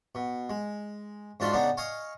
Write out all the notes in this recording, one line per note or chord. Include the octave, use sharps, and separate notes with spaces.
B2
G#3
G#2 D4 F4 F#4 E5 C6
C#3 B3 D4 D#4
D#5 F5 G#5 C#6